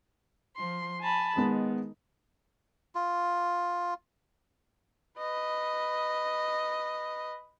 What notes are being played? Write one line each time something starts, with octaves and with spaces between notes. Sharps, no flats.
F3 C6
G#5 A5 B5
D#3 G#3 B3
F4
B4 D#5